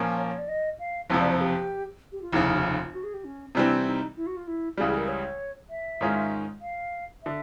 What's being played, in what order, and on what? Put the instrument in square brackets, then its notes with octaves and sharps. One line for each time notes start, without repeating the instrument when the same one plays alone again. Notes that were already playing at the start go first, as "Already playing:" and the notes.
Already playing: [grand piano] A#2 F3 A#3 C#4
[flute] C#5
C#5
D5
D#5
F5
[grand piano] F#1 F2 C3 F3
[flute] D5
C5
G4
G4
F4
[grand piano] F1 D#2 C#3 [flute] E4
[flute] F#4
F4
F#4
G#4
G4
C#4
[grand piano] C3 E3 G3 C4 [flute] D4
[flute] D#4
E4
F#4
F4
E4
[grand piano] C#2 C#3 E3 G3 [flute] G#4
[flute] G#4
A#4
C#5
E5
[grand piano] G#2 D#3 G#3 C#4 F4
[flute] F5
[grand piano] D3 [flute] E5